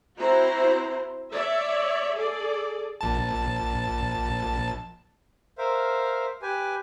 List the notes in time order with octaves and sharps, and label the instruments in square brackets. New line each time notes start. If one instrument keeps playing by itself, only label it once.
[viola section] C4 E4 F#4 C5 A#5
C#5 D5 E5
G#4 A4 D5
[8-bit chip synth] A#1 A5
[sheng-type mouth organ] A#4 C5 E5 F5
G4 B4 G#5